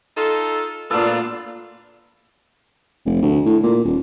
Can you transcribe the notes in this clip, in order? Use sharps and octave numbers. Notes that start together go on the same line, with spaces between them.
D#4 F4 A4
A#2 B3 D4 F4 A4
F1
D2
A2
A#2
D#1